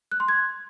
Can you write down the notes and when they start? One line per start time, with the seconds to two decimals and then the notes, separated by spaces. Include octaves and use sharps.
0.12 F#6
0.20 C6
0.28 G#6